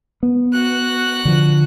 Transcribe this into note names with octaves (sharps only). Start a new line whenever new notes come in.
B3
F#4 F#6
D3 F3